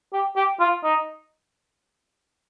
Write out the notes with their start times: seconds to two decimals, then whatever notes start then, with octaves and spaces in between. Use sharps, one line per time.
0.13 G4
0.36 G4
0.60 F4
0.84 D#4